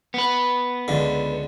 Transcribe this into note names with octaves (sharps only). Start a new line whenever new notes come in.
B3 B4
C#2 D3